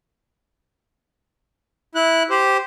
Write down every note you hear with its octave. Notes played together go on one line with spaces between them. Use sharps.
E4 F#6
G4 C5